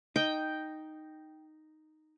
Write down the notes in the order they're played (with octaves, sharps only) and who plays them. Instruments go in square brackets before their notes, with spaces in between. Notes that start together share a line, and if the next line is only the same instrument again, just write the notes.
[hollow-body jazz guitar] D#4 [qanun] G5